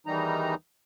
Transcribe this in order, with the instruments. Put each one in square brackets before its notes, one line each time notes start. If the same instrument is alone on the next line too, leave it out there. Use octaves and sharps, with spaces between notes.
[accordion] E2 D#3 E3 G3 D#4 A#5